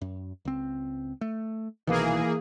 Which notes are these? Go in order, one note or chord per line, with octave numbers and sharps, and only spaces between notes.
F#2
C#2 C4
A3
C2 B2 D#3 E3 A#3 G#4